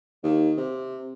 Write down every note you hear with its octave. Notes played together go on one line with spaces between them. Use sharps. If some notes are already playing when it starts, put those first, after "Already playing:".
D#2
C3